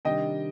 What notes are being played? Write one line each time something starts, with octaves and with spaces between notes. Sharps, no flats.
C3 D#3 G3 D4 D#5 G5